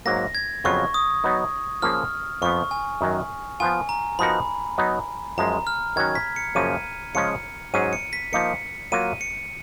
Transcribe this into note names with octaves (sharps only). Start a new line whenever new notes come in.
G#2 F#3 A#3 A#6
G#6
F2 C#3 F#3 B3 F4 C#6
D#6
F#3 B3 D#4
F3 A#3 C#4 G#4 F6
F2 F3 B3 C#6
G#5
F#2 D#3 F#3
F3 B3 F4 G#5
A#5
F3 B3 D#4 F#4 A#4 B5
F#3 B3 D#4
F#2 F3 G#3 A#5
F6
D#3 F#3 C#4 F#4 G#6
B6
C#7
F#2 C#3 F3 A#3 C#4 D#7
C#3 F3 G#3 C#4 C#7
G#2 F#3 C#4 G#4 D#7
C#7
B6
F3 A#3 D#4 A#4 C#7
F#3 A#3 F4 A#4 D#7
C#7